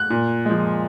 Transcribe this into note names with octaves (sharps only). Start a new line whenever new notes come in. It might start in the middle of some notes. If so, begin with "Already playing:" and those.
Already playing: F#6
A#2
F3 G#3